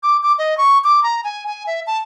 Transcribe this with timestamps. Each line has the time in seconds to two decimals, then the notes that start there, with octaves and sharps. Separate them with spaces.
0.03 D6
0.23 D6
0.38 D#5
0.58 C#6
0.84 D6
1.03 A#5
1.24 G#5
1.47 G#5
1.67 E5
1.87 A5